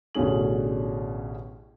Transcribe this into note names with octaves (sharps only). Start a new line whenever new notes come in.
A1 B2 D3 C#4 G#4 F#7